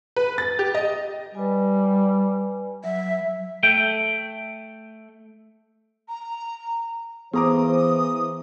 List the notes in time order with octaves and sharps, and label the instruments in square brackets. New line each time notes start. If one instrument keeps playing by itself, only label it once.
[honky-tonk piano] B4
A6
G4
D#5
[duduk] G3 [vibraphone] B4 G#5
[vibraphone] F#3 [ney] E5
[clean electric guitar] A3 G5
[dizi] A#5
[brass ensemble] E3 C5 [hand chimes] B3 [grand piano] G#4 A#5 D6 [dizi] D#6